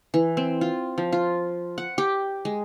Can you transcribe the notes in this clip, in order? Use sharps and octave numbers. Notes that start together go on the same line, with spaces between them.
E3
C4
F4
F3
F4
F#5
G4
G#3